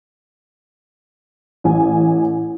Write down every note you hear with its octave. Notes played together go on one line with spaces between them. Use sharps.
A1 G#5